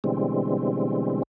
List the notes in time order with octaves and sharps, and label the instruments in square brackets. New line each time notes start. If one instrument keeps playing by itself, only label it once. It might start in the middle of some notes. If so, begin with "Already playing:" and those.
[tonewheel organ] B2 D3 E3 G3 G#3 C4